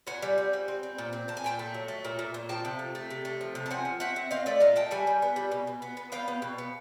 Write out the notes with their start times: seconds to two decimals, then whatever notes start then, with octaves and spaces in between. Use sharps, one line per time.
0.07 A#2 F#5 G#5
0.22 G3
0.38 C4
0.53 G3
0.68 C4
0.83 C4
0.98 A#2
1.13 C4
1.28 A#2 A5
1.37 G#5
1.44 A#2 G5 A5
1.59 A3
1.74 F#3
1.88 A3
2.05 A#2
2.19 A#2
2.34 A#2
2.49 F3 G5 A5
2.65 C3
2.79 A3
2.95 A3
3.10 C3
3.25 A3
3.41 F3
3.55 C3
3.66 A5
3.70 C4 F#5 G#5
3.85 F3
4.00 C4 E5 F#5
4.16 C4
4.31 C4 D#5 F5
4.46 A3 D5 E5
4.60 A#2 D#5 F5
4.76 A3 G5 A5
4.91 G3 F#5 G#5
5.07 G3
5.22 B3
5.36 G3
5.52 B2
5.67 B2
5.82 B3
5.97 B3
6.12 B3 F5 G5
6.28 B3
6.42 B2
6.58 B3